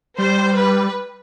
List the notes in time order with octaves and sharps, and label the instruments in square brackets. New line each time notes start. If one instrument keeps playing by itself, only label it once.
[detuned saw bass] G3 [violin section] C5
[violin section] B4